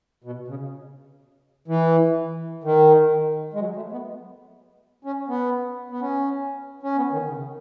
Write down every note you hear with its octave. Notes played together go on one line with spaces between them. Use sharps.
B2
C#3
E3
D#3
G#3
F#3
A3
B3
C#4
B3
B3
C#4
C#4
B3
D#3
C#3